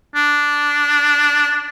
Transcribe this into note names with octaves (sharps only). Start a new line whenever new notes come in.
D4